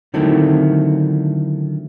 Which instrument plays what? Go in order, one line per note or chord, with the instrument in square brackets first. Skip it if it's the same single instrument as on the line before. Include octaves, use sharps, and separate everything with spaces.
[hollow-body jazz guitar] D3 D#3 F#3 A3 C4 E4